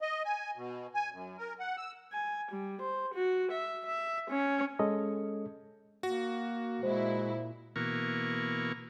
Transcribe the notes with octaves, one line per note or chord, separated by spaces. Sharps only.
D#5
G#5
B2
G#5
F#2
A#4
F#5
E6
G#5
G3
C5
F#4
E5
E5
C#4
G#3 C#4 A4 D#5
A#3 F#4
A#2 G#3 E4 C5
B2 E3 A#3 A#4 C#6